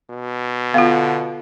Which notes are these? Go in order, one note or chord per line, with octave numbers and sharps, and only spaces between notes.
B2
D3 B3 F4 F5